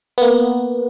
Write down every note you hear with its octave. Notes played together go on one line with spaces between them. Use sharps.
A#3 B3